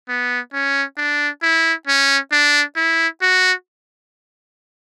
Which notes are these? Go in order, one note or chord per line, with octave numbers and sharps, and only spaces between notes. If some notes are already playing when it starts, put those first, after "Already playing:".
B3
C#4
D4
E4
C#4
D4
E4
F#4